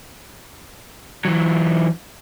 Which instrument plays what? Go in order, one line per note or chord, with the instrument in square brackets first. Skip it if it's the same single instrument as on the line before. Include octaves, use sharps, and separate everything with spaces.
[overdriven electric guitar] E3 F#3